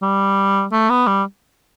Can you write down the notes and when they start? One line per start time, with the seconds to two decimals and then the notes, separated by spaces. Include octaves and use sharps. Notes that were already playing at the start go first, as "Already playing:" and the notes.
0.02 G3
0.73 A3
0.90 B3
1.07 G3